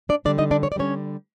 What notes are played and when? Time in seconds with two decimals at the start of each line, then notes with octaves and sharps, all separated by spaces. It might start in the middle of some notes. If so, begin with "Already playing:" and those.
0.09 D4 D5
0.25 D3 G3 D4 D5
0.38 D#4 D#5
0.51 D4 D5
0.63 C#5
0.72 D5
0.76 D3 G3 C#4 C#5